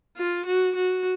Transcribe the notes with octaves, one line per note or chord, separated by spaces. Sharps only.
F4
F#4
F#4